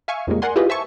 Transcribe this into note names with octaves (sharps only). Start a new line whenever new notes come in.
E5 F5 G#5 C#6
F2 A#2 C#3 G3 G#3 A#3
A#4 D5 F#5 G#5 C6
E4 F4 G4 G#4 B4 D#5
C5 E5 G#5 A5 C#6